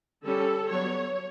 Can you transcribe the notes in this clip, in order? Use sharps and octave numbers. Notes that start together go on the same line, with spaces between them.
D3 G3 C#4 A4
F#3 B3 D4 C#5